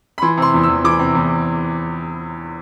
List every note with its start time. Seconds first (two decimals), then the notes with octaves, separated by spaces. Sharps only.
0.18 B5
0.22 E3 C6
0.37 C3 C6
0.54 E2
0.63 E6
0.69 E2
0.84 E3 D6
0.99 C3
1.15 E2